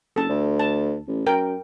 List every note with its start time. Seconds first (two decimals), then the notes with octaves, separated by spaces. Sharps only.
0.16 F#1 A4 A5
0.29 D2
0.59 A5
1.08 A1
1.26 F#2 A#4 G5